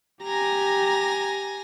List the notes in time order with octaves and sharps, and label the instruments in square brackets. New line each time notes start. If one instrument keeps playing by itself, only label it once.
[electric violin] G4 A#5 [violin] G#5 A#6